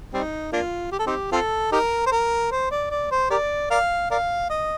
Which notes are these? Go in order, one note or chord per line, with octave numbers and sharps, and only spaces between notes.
G3 C4 D#4
A#3 D4 F4
G4
A4
C4 D#4 G4
C4 F4 A4
D#4 G4 A#4
C5
A#4
C5
D5
D5
C5
G4 A#4 D5
A#4 D5 F5
A#4 D5 F5
D#5